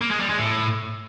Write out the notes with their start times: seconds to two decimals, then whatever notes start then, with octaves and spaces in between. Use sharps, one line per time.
0.02 A#3
0.11 G#3
0.20 G3
0.30 G#3
0.39 A2